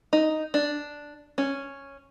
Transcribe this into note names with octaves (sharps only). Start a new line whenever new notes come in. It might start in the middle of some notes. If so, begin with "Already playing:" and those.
D#4
D4
C#4